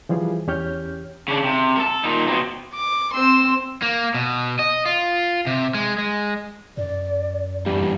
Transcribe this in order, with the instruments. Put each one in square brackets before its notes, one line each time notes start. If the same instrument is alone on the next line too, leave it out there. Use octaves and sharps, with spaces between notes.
[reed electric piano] E3 F3 G3 G#4
E2 C#4 G4 C#5 F6 G6
[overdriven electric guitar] C#3 D4
C3
A4 A#4
A#2 D#4
B2 C4
[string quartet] D6
C4 C5 C6 E6
[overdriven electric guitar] A#3
B2
D#5
F4
C3
G#3
G#3
[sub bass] F#2 [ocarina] D5
[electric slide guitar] E2 G2 [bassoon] G3